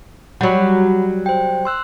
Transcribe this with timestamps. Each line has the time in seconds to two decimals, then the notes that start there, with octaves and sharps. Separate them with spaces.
0.41 F#3 G3 F#5 B5
1.26 C5 G5
1.65 C6 E6 F#6